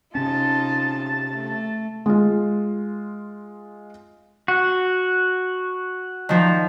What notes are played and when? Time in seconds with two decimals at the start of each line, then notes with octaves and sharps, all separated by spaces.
0.15 C3 C#4 D#4 F4 A5
1.33 A3
2.06 G#3 F4
4.48 F#4
6.29 D#3 F3